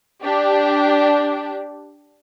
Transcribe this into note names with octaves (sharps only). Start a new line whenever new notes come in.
D4 G4